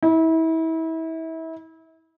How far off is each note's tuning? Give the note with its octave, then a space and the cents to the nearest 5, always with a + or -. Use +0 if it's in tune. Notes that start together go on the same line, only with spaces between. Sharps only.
E4 -30